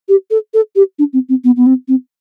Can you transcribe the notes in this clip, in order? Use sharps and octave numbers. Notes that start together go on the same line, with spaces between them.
G4
A4
A4
G4
D4
C4
C4
B3
B3
C4
C4